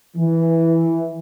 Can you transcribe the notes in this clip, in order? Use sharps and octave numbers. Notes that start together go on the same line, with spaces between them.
E3